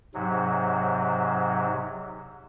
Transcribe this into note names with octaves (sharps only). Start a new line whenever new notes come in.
G#2 C3 F#3